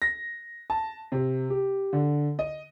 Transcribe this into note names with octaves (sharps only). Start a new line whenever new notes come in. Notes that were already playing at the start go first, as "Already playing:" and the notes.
A#6
A5
C3
G4
D3
D#5